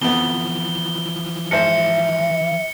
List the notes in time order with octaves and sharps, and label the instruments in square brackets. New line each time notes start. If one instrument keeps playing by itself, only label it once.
[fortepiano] F2 B3 [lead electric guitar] E3 F3 [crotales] G7
[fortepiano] G#1 C5 [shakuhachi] E5 [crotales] C#7